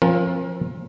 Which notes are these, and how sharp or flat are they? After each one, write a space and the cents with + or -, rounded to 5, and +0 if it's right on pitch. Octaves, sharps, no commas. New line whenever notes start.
F3 +0 C4 +45 A#4 +30